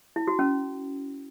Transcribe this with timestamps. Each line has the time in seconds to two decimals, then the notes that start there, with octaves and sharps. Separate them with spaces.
0.16 E4
0.27 F#4
0.39 C#4